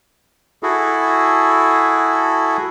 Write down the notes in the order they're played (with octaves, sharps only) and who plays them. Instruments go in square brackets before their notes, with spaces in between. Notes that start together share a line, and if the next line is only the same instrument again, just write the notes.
[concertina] E4 F#4 G#4 A4